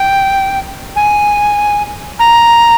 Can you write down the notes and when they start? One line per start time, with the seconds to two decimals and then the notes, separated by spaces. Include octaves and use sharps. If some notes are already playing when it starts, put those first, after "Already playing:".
Already playing: G5
0.96 G#5
2.19 A#5